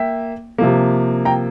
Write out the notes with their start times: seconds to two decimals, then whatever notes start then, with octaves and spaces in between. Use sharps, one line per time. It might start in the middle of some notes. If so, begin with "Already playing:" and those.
Already playing: A#3 E5 G5
0.58 C3 F3 A#3
1.25 G5 A#5